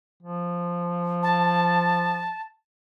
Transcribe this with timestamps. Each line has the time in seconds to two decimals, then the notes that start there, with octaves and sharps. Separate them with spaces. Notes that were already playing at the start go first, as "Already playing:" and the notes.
0.23 F3
1.23 A5